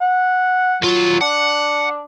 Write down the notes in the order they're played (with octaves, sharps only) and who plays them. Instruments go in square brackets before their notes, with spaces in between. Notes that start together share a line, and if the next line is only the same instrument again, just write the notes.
[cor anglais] F#5
[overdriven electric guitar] D#2 F4 [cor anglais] F#3
[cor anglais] D4 [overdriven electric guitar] F#5